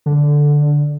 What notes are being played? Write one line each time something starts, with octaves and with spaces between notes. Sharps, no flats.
D3